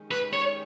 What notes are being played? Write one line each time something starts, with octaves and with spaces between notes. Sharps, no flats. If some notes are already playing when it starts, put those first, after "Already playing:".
Already playing: D#3 G#3 C#4 G4
B4
C#5